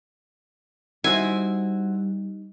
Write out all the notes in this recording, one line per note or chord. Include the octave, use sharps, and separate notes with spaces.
G3 D#4 E4 F#4 C5 G#5